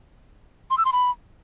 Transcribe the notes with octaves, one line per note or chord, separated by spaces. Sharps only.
C6
E6
C6
B5